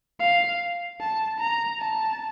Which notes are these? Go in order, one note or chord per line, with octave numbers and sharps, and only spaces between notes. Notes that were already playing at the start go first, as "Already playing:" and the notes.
F5
A5
A#5
A5